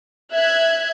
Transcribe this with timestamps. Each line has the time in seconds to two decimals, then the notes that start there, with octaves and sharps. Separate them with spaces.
0.32 E5 F#6 G#6